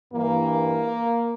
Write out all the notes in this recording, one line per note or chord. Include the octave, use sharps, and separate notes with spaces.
G2 E3 A#3